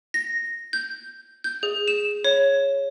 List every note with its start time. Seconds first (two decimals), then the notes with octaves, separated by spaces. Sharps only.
0.14 A#6
0.73 G6
1.44 G6
1.63 G#4
1.88 E7
2.24 C#5